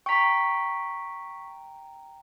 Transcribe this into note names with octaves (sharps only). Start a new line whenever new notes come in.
G5 A#5 C#6 B6